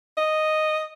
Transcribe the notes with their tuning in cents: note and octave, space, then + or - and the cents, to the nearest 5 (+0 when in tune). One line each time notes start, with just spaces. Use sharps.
D#5 -5